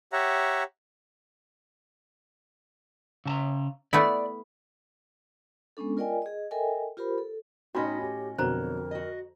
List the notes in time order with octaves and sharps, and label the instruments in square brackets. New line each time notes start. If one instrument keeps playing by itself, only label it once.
[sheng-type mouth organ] G4 C#5 E5 F#5 A#5
[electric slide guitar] C#3 A5 A#5
[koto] A3 B3 E4 [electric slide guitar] D5
[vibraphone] G#3 B3 C#4 D4 A4
F4 A#4 D5 D#5 G5 G#5
G#4 D#5
A4 A#4 D#5 E5 G5 G#5
F4 G4 A#4 C5 B5
A4
[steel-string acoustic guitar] A2 C#4 D#5 [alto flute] D#4 [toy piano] F#4 [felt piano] G5 B5 A#6
[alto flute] G4 [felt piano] G#5
[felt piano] F2 D3 [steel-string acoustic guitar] B2 F#3 [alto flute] A#4 [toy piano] C5 A#5
[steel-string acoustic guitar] F#4 D#5